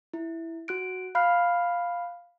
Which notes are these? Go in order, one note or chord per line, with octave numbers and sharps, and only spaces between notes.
E4
F#4 F#6 D7
F5 B5 F6 F#6 C7